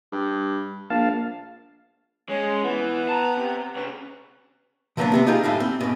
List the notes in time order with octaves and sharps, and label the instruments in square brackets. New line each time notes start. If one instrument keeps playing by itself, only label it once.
[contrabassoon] G2
[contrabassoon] A#1 [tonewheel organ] A#3 F5 A5
[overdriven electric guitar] G#3 [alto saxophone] C#4
[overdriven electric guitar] E3 [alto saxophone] B3
[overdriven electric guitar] A5 A#5
C3
[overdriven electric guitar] C3 C#4 [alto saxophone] B4
[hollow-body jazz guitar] D3 F3 F#3 A#3 B3 D4
C3 B3 C4
D#4 F4 G4 G#4 F5
F#2 A2 D3 G3 F5
C4
G#2 B2